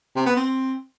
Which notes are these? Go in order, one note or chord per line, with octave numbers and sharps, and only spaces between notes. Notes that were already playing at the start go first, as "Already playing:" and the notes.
C3
B3
C4